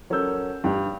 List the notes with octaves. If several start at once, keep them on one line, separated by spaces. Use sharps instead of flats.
F#3 C#4 A4 A#4 E6 G6
G2 G5